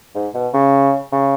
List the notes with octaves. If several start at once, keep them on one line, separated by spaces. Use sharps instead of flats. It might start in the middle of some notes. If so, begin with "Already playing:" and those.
G#2
B2
C#3
C#3